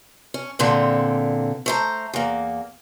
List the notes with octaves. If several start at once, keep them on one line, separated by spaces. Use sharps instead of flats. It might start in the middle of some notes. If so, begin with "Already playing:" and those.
C#4
E2 A#2 D3 C4
A3 C5 A#5
E2 A#3